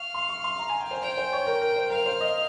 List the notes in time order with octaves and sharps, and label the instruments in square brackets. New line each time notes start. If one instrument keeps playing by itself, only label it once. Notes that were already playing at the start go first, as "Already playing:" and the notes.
Already playing: [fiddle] F5 [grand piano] C#6
[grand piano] C6
C#6
C6
A#5
G#5
G5
C5
[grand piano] C5 [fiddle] G5
[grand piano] C5
C#5
A#4
A#4
C5
[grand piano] A#4 [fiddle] F5
[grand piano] C5
D#5